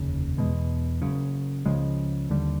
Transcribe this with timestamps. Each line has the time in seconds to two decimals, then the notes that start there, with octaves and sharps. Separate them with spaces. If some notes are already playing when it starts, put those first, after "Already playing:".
Already playing: F1 D#2 C#3
0.37 E2 B2 G#3
1.02 F#1 F#2 C#3
1.66 C#2 C#3 F3 G#3
2.30 D#2 D3 G3